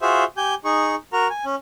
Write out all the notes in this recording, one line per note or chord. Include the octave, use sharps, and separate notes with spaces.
F4 F#4 G#4 C5 E5
G4 G#5 G6
D#4 G#4 C#6
F#4 A#4 A#5
G#5
C#4